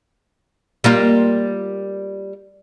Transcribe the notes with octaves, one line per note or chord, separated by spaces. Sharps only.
G3 A#3 F4